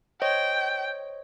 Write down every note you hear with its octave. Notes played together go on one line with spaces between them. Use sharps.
C5 C#5 D#5 G5